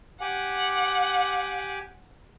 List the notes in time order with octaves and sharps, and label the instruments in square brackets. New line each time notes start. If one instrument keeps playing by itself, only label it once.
[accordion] G4 G#5 D6 [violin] F#5